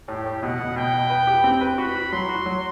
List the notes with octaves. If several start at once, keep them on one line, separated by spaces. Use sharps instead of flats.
A2 G4
A2
B2 F#5
B2
B2 G5
B2
B4
G4
C4
B4
F#4 B5
F#4
F#3 C6
F#4
F#3